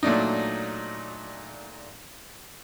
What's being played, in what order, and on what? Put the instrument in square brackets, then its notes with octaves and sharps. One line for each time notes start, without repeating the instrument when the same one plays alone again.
[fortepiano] A#2 F#3 A3 D4 D#4